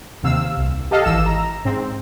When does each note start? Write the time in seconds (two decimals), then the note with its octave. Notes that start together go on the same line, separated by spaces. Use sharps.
0.23 D#2 C3 F5 E6
0.57 C2
0.91 G4 A4 D#5 F5
1.05 G#1 E3 E6 E7
1.26 A#5
1.65 G#2 C4